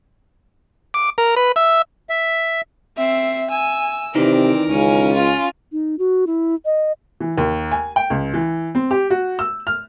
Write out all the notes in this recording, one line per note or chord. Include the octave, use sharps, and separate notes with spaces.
D6
A#4
B4
E5
E5
C4 E5 C7
G#5 E6
C3 D#3 E3 C4 A#4 D5
C#2 C#4 G#5
F4
D#4
F#4
E4
D#5
E3
D#2
G#5
G5
C#2
E3
C4
G4
F#4
E6
F6